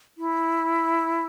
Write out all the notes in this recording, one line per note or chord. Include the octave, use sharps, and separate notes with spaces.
E4